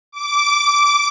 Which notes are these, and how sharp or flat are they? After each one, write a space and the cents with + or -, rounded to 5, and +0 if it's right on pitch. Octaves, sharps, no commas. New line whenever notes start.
D6 -15